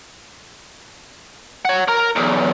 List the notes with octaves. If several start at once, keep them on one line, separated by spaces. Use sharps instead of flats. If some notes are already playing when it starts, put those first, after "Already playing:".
C#5 F#5
A#4 A#5
B1 E2